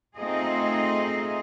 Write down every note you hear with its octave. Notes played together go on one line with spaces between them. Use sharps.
A3 C4 D#4 F4 G#4 D#5